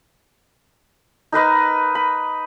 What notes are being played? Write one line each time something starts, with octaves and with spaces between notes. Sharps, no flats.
D#4 A#4 B4 D#5
B5